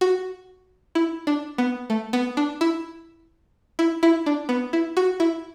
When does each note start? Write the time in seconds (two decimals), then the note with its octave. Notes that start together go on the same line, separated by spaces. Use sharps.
0.01 F#4
0.95 E4
1.27 D4
1.58 B3
1.90 A3
2.13 B3
2.37 D4
2.61 E4
3.79 E4
4.03 E4
4.26 D4
4.49 B3
4.73 E4
4.97 F#4
5.20 E4